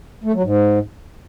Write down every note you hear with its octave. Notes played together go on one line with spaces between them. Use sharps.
A3
F#3
G#2